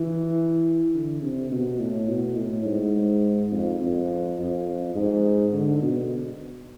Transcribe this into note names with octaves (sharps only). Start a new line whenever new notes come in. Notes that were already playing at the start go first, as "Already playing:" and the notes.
Already playing: E3
D3
C3
B2
A2
B2
A2
G#2
F2
F2
F2
G#2
D3
B2